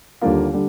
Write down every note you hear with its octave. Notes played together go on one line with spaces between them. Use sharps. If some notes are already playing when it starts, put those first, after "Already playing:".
D#2 D3 G3 A#3 F4
D3 G3